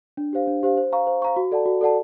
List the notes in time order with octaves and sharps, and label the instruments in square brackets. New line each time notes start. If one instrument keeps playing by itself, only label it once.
[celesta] D4
G4 C5 F5
D4
G4 C5 F5
C5
F5 A#5 C#6
C5
F5 A#5 C#6
F#4
A4 D5 F#5 A5
F#4
A4 D5 F#5 A5